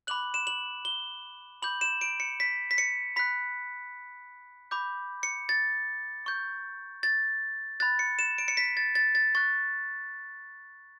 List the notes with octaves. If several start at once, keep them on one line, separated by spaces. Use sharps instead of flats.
B5 D6 F#6 F#7
E7
F#7
G7
B5 D6 G6 F#7
E7
D7
C#7
B6
B6
C#7
B5 F#6 B6
B5 D6 G6
C#7
A6
C#6 G6
A6
B5 F#6 A6
C#7
E7
D7
C#7
B6
A6
A6
A6
C#6 F#6 A6